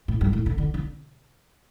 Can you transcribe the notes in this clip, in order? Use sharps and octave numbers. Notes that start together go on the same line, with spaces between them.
A2
G2
A2
D3
D3
D3